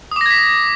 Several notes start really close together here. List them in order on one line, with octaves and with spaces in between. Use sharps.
D#6 D6 A#6 G#6 B6